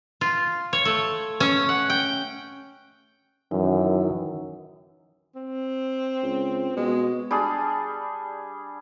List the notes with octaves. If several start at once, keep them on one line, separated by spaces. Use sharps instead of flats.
F4
C#5
A3
C#4
F#5
G5
F#2 D#3 E3
C4
C#2
B2 G#3
G3 D4 G#4